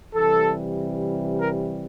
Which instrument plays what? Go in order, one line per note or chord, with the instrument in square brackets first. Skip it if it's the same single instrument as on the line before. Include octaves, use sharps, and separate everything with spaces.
[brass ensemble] C3 E3 G3 A4
A#4